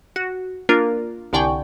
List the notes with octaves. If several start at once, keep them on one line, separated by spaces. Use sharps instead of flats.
F#4
A#3 D4 F4 A#4
C2 D3 D5 G5 G#5 C#6